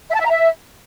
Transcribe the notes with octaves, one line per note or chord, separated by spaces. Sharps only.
E5
A5
E5
A#5
E5